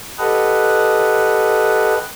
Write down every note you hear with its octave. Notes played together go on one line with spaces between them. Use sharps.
G4 A4 B4 D#5 F#5